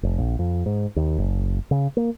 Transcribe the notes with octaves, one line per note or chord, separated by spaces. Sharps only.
F1
A#1
F2
G#2
D#2
F#1
C#3
A#3